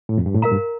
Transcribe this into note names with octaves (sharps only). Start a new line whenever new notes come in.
A2
F2
G2
A2
A#2 A#4 F5 A#5
G2